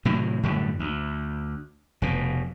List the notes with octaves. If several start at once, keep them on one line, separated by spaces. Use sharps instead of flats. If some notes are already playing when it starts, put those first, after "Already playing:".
A2 C3 D#3 F#3
F#2 A2 D3 G3
D2
F1 B2